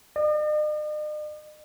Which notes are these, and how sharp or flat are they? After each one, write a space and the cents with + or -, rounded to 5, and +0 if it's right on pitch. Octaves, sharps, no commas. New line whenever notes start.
D#5 -45